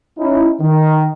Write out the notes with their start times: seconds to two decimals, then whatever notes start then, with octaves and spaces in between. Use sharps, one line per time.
0.18 C#4 D#4 E4
0.60 D#3